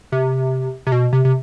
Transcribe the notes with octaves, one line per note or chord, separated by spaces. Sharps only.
C3
C3
B2
C3
C3